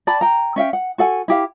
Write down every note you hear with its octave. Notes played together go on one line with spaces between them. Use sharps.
D5 G5 A5 B5
G5 A#5
C#4 E5 F5 G5
F#5
F#4 A4 F#5 G#5
E4 G4 F5